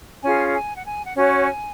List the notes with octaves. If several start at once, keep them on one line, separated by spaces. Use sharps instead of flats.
C#4 F4 G#4 G#5
G#5
F#5
G#5
F#5
C#4 F#4 C#5 G#5